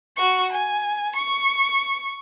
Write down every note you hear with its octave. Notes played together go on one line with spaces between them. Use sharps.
F#4 C#6
G#5
C#6